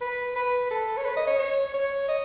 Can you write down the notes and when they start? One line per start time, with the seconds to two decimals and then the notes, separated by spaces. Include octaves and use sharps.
0.01 B4
0.36 B4
0.71 A4
0.97 C#5
1.05 B4
1.17 D#5
1.27 C#5
1.39 C#5
1.74 C#5
2.08 D#5